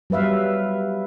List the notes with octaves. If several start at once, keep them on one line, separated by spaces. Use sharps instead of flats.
F#3 G3 B4 E5 F5